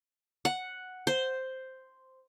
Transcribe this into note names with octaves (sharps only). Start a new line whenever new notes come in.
F#5
C5